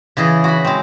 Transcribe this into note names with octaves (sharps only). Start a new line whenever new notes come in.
C#3 E3 G#4 D#5
F#4 B5
G#3 C4